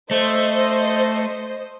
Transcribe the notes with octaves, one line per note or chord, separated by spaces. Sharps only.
A3 C5 D#5